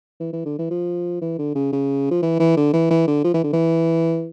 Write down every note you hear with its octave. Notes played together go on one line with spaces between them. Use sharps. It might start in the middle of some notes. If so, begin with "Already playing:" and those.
E3
E3
D3
E3
F3
E3
D3
C#3
C#3
F3
E3
E3
D3
E3
E3
D3
F3
E3
D3
E3